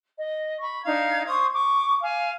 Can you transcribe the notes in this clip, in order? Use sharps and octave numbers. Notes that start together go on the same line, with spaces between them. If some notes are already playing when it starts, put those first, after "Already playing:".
D#5
B5 C#6
D4 D#4 F5 G#6
C5 C#6 D#6 G#6
C#6 D6
F5 G#5